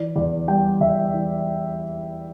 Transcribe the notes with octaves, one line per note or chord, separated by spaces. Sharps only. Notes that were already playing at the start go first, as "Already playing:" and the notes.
Already playing: E3 D5
E2 D5
G3 G5
E2 E5
E3